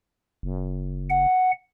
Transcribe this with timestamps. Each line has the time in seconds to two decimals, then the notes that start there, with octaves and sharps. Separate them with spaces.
0.43 F#1
1.10 F#5